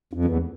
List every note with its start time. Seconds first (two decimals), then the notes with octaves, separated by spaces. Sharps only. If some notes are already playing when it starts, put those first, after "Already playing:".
0.13 F2
0.25 E2